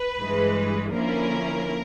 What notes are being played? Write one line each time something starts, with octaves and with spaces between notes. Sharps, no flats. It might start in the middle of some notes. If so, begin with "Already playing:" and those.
Already playing: B4
G2 E3 G#3
D3 F3 A#3 C#4 E4 A#4